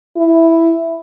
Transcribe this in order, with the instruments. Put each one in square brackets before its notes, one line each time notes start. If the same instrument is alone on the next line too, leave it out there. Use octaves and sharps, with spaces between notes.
[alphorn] E4